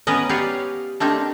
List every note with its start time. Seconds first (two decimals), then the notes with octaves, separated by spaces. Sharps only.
0.07 B3 C#4 A#4 B4 D#5
0.29 G4 B4 C#5 D5 F5
1.00 A3 A#3 C4 D4 D#4 G4